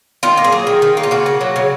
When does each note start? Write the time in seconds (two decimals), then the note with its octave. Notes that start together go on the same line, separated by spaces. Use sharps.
0.23 D#3 F4
0.37 A#3
0.44 G#4
0.52 F#3
0.67 D#3
0.82 D#3
0.97 A#3
1.03 F4
1.11 C#3 F#4
1.26 A#3
1.41 F#3
1.56 C#3